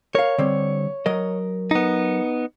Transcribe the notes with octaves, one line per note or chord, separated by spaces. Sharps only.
A#4 C#5 F5
D3 G3 C4
F#3 A#4 D#5
B3 D#4